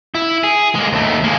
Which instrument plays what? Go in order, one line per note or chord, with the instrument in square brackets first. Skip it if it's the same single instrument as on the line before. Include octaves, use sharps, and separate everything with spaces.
[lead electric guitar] E4
G#4
G#3 A#3
D#2 A3
G#3 A#3